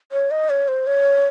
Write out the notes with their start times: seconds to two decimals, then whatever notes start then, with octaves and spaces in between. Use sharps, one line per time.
0.12 C#5
0.31 D#5
0.50 C#5
0.68 C5
0.87 C#5